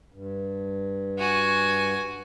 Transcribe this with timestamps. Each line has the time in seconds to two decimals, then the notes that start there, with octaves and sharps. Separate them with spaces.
0.12 G2
1.18 F#4 G#5